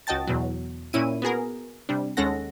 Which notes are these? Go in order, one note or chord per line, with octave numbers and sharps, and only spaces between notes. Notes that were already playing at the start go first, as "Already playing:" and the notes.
C#2 F#4 D#5 G5 A5 A6
E2 B2 F#3
A#2 C#4 E4 D#7
B3 F#4 G#4 A#4
C3 G3 D4
D#2 G#3 C#4 A4 F#5 A#6